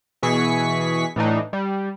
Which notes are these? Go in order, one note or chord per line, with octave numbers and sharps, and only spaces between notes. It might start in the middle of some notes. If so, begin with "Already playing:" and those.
B2 E3 G#4 C#6 B6
A2 E3 D4 D#4
G3